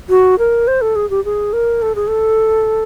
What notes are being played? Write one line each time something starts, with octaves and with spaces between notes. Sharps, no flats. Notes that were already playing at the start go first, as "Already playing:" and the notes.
F#4
A#4
C5
A4
G#4
G4
G#4
A#4
A4
G#4
A4